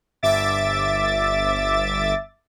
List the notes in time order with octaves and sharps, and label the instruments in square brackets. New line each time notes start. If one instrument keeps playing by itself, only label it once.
[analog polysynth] G1 E5 D6 A6